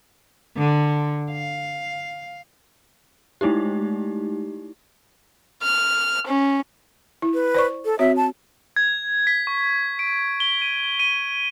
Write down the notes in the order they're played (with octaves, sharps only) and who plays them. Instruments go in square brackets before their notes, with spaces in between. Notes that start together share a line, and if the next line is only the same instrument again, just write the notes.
[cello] D3
F5
[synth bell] G#3 A3 D#4 E4 G4
[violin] F6
C#4
[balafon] E4
[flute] B4
[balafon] C5 D5 C#6
[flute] A4
[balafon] C4 F#4 C#5 [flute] E5
[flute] A5
[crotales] G#6
B6
C#6
D7
G7
D#7
D#7